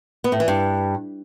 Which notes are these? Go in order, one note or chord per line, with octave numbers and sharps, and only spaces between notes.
B3
A2
E3
G2